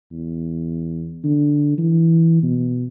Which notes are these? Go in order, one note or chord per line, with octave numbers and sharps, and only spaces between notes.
E2
D3
E3
B2